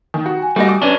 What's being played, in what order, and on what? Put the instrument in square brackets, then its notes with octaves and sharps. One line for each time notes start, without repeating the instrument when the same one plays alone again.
[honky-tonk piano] D#3
F#4
[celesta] G5 G#5
[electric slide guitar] G3 [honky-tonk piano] A3 F#4 D#5
[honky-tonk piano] D6
[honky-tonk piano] F#2 [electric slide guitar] C#4 D4 [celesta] B4 D5 G7